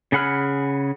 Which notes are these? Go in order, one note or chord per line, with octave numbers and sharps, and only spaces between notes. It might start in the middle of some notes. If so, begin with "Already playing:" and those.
C#3 G#4 F#5 B5 F6